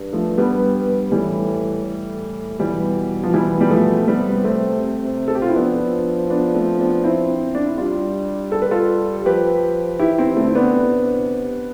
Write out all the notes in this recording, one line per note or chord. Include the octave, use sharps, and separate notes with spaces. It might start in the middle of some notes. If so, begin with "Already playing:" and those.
Already playing: G2
F3 A3
G3 B3
A2 E3 G3
A2
B2 E3 G3
F3
E3 G3
G3
F3 A3
C3 G3 B3
A3 C4
C3
A4
G4
F4
E4
F3 B3 D4
B3 D4
A3 C4
B3 D4
C4 E4
D4
E4
G3 D4 F4
A4
B4
F4 A4
F3 G4 B4
E3 E4 G4
C4 E4
D3 A3 C4
E4
B3 D4
C3